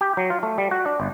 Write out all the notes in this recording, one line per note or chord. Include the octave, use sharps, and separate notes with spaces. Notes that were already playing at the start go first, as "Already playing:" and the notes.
G4
F#3
F4
A3
G3
F#4
D4
G1